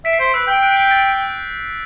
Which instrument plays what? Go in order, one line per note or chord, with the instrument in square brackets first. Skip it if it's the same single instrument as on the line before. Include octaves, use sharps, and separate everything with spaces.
[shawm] E5 [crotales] B6 D7
[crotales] C7
[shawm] C5 [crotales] B6 D7
[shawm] B4 [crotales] E6
[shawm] G5 [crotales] E6
[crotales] F#6
G6
A6